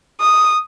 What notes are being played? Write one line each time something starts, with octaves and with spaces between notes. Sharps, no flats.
D#6